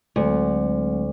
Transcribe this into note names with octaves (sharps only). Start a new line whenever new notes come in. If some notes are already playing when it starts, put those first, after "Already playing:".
D2 F#3 G#3 C4